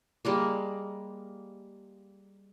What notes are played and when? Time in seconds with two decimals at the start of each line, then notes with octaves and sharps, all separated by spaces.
0.25 G3 G#3 A#3